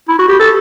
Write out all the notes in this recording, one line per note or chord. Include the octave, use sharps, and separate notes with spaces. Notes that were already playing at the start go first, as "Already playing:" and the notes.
E4
F#4
G4
A4